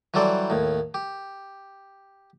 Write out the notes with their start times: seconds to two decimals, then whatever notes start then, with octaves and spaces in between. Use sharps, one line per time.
0.14 E3 F#3 G3 A4 C5 D5
0.50 D#2 A2
0.94 G4